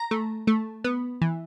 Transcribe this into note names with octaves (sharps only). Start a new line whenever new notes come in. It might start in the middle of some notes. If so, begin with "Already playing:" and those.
Already playing: A#5
A3
A3
B3
E3